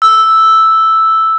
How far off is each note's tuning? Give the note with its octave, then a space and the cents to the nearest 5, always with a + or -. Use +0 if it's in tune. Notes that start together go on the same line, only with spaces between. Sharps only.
E6 +0